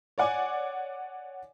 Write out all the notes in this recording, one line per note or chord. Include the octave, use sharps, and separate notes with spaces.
C#5 D5 F#5 G#5 D6